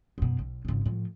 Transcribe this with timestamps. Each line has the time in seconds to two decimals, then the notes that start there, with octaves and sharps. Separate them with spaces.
0.18 F#2 B2
0.39 B1
0.65 G#1 C#3
0.86 A2 F3